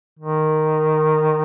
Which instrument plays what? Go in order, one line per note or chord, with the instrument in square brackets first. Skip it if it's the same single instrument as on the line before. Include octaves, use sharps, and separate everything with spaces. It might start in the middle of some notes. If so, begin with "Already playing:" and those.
[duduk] D#3